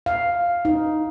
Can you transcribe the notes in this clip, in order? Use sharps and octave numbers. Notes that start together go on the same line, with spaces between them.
F5
D#4